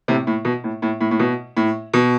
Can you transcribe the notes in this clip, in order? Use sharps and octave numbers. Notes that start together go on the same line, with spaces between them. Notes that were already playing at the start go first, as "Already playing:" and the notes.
A2 C3
A2
B2
A2
A2
A2
A2
B2
A2
B2